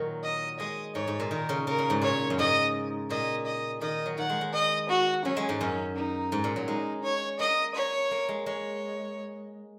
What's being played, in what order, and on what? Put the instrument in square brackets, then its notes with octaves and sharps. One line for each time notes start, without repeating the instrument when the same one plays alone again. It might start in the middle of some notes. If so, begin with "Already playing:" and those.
Already playing: [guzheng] A#2 D#3 F#3
[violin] D#5
[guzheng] G#3 [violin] D#5
[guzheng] G#2 [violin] C#5
[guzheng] G#2
A#2
[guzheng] D#3 [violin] A#4
[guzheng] C#3
[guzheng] C#3 [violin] A#4
[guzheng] A#2
G#2
[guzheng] A#2 [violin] C#5
[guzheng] F#2
[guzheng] G#2 [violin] D#5
[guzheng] A#2 [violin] D#5
[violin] D#5
[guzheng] D#3 [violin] D#5
[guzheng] F#3
[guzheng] D#3 [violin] F#5
[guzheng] G#3
G#3
[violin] D#5
F#4
[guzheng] F#3 [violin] C#4
[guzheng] G#3
G#2
[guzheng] F#2 [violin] C#4
[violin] D#4
[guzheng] G#2
A#2
F#3
[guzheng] G#3 [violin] D#4
[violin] C#5
[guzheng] A#3 [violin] D#5
[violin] C#5
[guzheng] A#3
G#3
[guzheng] G#3 [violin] C#5